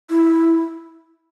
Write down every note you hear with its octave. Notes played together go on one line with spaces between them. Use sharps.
E4